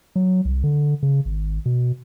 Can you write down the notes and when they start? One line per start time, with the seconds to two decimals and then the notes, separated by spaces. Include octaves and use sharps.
0.16 F#3
0.45 C2
0.64 D3
1.03 C#3
1.25 G#1
1.66 B2